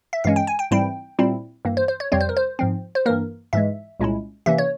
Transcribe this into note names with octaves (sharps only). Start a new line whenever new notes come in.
E5
G2 E3 G#3 C#4 F5
G5
G#5
G5
G#2 E3 G3 C4 E4 G5
A#2 G3 C4 E4
G2 E3 A#3
C5
C5
C#5
F2 C3 G3 C4 C#5
C5
A#4
C5
G#2 F3 C4
C5
G2 E3 A#3 A#4
G#2 E3 G#3 E5
C2 A#2 G#3 C#4 E4
C3 E3 A#3 C#4 E5
C#5